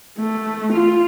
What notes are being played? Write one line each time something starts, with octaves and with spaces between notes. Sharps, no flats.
A3
F4